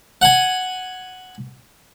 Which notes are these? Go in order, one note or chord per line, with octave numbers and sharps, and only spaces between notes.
F#5 G#5